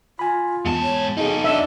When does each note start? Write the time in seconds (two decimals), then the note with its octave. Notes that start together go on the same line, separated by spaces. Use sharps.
0.19 F4 G#5 B5
0.65 E2 G#2 A5
0.83 C#5
1.17 D#4 G#4 A4
1.44 D4 E5